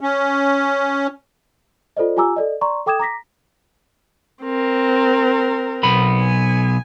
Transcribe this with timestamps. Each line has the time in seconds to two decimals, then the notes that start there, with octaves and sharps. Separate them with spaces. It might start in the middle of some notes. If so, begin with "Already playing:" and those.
0.01 C#4
1.97 F4 A4 C5 D5 D#5
2.17 F4 G4 G#5 A#5 D6 E6
2.36 A4 D5 D#5
2.61 D5 A#5 C6 C#6
2.86 A4 G5 D6 D#6 G#6 E7
2.99 A#5 D6 A#6 B6
4.44 C4 A#4
5.83 B1 B3 B5
6.20 G#5